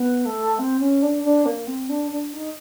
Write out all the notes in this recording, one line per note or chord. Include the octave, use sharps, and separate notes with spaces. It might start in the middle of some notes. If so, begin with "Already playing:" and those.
Already playing: B3
A3
C4
C#4
D4
D4
A#3
C4
D4
D4
D#4